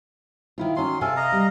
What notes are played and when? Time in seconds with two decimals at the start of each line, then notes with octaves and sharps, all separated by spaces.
0.58 D#3 E4 F4
0.76 D#3 F#3 C#4 C6
1.01 C3 C4 A4 F5 G#5
1.17 D#5 F5 A#5
1.32 G3